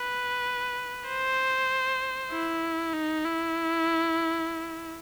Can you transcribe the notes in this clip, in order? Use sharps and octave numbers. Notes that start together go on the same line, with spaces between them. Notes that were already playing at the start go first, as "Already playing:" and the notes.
Already playing: B4
C5
E4
D#4
E4